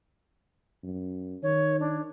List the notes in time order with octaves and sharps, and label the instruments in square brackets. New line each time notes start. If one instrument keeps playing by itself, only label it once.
[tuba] F#2
[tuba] D#3 [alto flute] C#5
[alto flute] D4